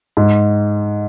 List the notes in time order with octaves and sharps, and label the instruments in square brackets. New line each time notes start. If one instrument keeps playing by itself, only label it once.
[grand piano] G#2